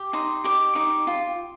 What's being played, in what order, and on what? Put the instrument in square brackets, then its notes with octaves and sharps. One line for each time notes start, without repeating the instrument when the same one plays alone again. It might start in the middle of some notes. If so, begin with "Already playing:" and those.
Already playing: [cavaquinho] G4
D#4 C6
G4 D6
D#4 D6
F4